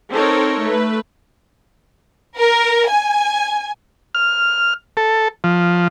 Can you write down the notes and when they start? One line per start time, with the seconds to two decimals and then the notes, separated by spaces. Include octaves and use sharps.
0.11 C4 D#4 A4 A#4 C#5
0.63 A3 B4
2.38 A#4
2.89 G#5
4.15 F6
4.97 A4
5.44 F3